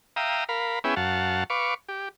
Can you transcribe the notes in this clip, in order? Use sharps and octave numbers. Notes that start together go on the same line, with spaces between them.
E5 F5 G5 A#5 D#6
A#4 F5 B5
B3 C#4 E4 G#4 E5 G5
F#2 F5 F#5 A5
B4 F5 C#6 D6
G4